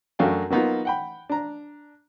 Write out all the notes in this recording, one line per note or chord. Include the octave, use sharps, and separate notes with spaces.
F#2 A3 D4 F#4 F5 G5
F#3 A#3 B3 D#4 F4
F#5 G5 B5
D4 A#5